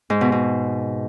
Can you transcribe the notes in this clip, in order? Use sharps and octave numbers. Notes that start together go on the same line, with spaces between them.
G#2
B2
B2